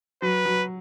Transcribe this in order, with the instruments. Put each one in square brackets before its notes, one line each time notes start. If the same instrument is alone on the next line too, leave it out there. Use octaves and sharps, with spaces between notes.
[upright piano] F#3 [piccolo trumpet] B4
[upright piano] F#3